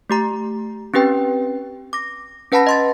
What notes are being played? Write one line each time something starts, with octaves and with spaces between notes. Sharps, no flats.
A3 G4 A#5
C4 C#4 G4 B4 G5
D6 A#6
C#4 B4 F#5 A5 B5 A#6
D#5 C6 A6